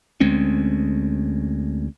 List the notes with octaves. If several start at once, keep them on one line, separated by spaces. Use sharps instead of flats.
D2 G#3 C4 C#4